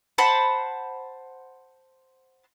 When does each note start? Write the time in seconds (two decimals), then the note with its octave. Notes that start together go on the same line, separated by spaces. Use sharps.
0.18 C5 F#5 A5 B5